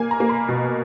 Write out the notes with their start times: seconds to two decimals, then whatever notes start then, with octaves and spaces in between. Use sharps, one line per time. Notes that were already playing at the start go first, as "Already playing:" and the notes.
Already playing: A#3 G#5
0.11 A#5
0.20 A#3
0.29 B5
0.49 B2